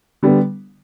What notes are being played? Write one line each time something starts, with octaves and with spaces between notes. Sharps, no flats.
D3 G3 B3